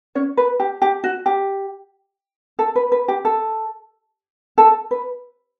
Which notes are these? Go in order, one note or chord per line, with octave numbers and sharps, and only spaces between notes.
C#4 C#5
B4
G4
G4
F#4
G4
A4
B4
B4
G4
A4
A4
B4